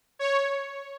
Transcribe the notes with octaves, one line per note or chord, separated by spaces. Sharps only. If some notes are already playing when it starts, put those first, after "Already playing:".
C#5